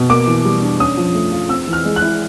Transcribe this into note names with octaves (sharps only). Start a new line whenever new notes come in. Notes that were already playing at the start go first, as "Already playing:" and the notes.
Already playing: B2
A#3 D6
E3
G3
D4
C#4 D#6
F3
A3
F4
C4 E6
E3
F6
G#3
F#6
E4